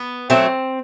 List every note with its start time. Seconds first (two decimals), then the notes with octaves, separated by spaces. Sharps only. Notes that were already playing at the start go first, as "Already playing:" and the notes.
Already playing: B3
0.30 F#3 A3 C4